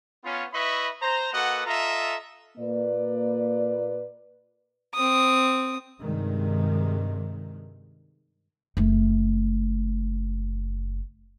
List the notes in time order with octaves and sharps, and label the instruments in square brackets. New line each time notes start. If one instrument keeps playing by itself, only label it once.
[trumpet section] B3 C#4 F4
E4 B4 D#5 E5 B5 C#6
C5 A#5
A#3 F#4 A4 B4 D#5 F#5
F4 A4 D#5 E5 A#5
[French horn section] A#2 A#3 B4 D5
[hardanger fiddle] C4 D#6
[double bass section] G2 C3 D#3 G#3
[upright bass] F#1 A3